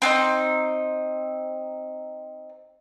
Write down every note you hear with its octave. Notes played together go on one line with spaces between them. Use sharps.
C4 D4 D#4